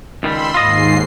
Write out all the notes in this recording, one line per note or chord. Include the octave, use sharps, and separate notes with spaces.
C#2 D#3 G3 B5 C6 E6
D#2 G#2 F4 D#5 C7